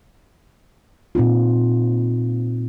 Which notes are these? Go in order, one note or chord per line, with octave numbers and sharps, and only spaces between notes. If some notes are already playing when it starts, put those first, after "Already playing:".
A#2 C4 D#4 F4